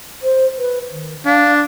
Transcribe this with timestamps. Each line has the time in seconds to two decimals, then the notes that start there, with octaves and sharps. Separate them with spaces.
0.22 C5
0.58 B4
0.91 D#3
1.26 D4 F5